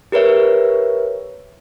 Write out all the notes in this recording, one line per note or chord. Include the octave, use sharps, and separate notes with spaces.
G4 A#4 B4 C#5 E5